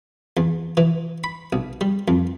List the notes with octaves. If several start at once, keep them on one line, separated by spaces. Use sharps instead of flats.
E2
E3
B5
B1
G3
F2